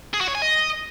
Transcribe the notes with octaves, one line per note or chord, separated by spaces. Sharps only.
G#4
F#4
C#5
G#5
D#5